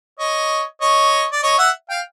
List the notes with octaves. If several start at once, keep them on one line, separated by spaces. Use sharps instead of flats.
C#5 D#5
C#5 D#5
D5
C#5 D#5
E5 F#5
F5 G5